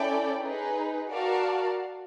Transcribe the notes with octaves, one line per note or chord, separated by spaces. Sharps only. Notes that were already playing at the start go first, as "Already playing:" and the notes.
Already playing: C#4 E4 A4 D5 G5
D#4 G#4 B4
F#4 A#4 D5 F5 A5